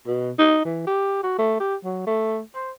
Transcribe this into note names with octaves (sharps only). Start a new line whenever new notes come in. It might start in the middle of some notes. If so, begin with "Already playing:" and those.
B2
D#4
E3
G4
F#4
A3
G4
F#3
A3
C5